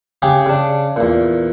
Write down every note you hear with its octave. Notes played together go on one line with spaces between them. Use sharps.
C#3 G4 G#4
C#3 D4
E2 A#2